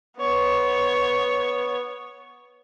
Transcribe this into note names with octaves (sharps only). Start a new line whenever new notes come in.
B3 C#5